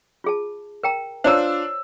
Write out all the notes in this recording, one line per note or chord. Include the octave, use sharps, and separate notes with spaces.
F4 G#4 A5
A#4 G5 A#5
D4 F4 C5 C#5 A#5 E6